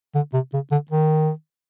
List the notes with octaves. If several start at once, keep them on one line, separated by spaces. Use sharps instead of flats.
D3
C3
C#3
D3
D#3